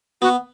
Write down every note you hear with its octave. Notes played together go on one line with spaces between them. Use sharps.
B3 F#4